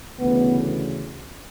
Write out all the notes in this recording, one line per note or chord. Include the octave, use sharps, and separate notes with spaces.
D2 C#3 E3 B3